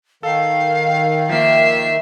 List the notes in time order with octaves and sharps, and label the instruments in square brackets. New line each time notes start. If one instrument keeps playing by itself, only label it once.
[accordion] D#3 [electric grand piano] A4 [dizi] F5
[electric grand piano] F3 A#3 [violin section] E5 C7